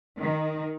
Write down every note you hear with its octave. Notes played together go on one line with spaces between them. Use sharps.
D#3